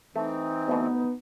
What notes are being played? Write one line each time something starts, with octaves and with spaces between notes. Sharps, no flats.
E3 A3 C4 D#4
D2 B2 B3